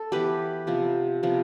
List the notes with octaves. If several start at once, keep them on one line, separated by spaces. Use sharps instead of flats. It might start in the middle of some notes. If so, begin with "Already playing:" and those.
Already playing: A4
E3 B3 G4 B4
C3 F3 B3
C3 F3 B3